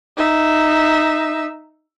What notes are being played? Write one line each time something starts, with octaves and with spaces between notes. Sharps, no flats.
D#4 E5